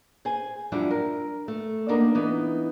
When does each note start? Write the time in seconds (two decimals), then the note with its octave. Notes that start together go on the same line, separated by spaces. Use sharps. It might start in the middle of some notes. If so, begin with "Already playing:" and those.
0.25 G#4 C5 G#5
0.72 F#2 F3 G3 D4 E4 E5
0.91 A#4
1.48 A3
1.88 A#3 B3 D4 D#4 A#4
2.15 E3 B3 D#4